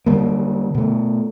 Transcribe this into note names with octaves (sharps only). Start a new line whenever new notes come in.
D3 F#3 G3 A#3
B2 A3